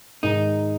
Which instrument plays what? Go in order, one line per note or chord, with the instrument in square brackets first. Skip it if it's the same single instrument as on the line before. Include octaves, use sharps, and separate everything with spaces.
[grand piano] G#2 D#3 G#3 [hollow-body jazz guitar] D#4